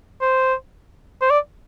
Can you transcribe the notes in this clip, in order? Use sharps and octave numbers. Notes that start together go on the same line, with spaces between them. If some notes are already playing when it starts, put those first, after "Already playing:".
C5
C5
D5